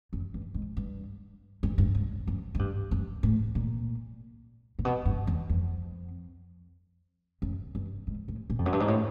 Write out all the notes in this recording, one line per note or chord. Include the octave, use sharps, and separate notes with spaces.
F#2
G2
G#2
G2
G2
G2
G#2
F#2
G#2
G2
F#2
A2
A#2
A#2
B2
G2
E2
F2
F#2
G2
G#2
A2
A#2
F2
F#2
G2
G#2
A2